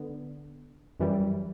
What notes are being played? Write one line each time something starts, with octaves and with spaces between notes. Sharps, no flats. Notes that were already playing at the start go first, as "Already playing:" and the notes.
Already playing: D3 B3
F#2 E3 G3